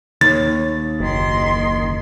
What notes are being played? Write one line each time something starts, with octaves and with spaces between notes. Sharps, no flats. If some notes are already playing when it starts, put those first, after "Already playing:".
D#2 A6
F#1 D#3 C6